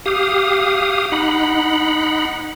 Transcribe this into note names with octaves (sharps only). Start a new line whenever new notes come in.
G4 F5 D#6
D#4 F#5 B5